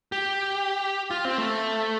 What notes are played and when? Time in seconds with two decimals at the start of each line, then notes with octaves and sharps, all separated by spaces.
0.12 G4
1.11 F4
1.25 C4
1.38 A3